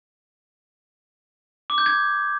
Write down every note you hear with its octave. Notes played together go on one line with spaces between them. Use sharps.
D6
G6
G#6